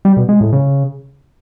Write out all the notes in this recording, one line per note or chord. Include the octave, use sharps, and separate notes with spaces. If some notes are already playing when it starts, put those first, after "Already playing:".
G3
B2
G#3
A2
C#3